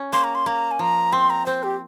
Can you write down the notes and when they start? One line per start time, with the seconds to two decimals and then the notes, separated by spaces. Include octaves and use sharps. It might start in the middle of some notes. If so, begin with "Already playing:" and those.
Already playing: C#4
0.13 A#3 C6
0.24 A#5
0.35 C6
0.46 A#3 A#5
0.71 G#5
0.79 F3 A#5
1.12 C4 C6
1.30 A#5
1.46 C4 C5
1.63 G4